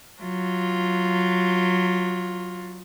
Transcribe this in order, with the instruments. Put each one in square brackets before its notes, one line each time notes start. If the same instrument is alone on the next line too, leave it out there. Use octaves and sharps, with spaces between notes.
[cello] F#3 F4